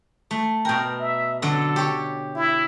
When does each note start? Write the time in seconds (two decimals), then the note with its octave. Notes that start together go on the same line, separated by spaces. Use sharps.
0.31 A3
0.65 B2 A#4 G5
1.00 E5
1.42 D3 F#3 A4
1.76 G4 C#5
2.35 E4